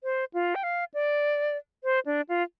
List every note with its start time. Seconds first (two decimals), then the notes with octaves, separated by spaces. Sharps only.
0.04 C5
0.34 F4
0.55 G5
0.63 F5
0.94 D5
1.84 C5
2.06 D4
2.29 F4